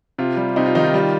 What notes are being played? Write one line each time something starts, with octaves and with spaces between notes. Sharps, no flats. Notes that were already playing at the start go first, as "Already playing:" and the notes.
C3 F4
G3
C3 D#4
F4
D#3 D#4
F4
G3